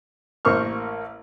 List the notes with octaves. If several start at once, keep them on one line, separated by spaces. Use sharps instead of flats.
A1 A#3 C5 C#6 F6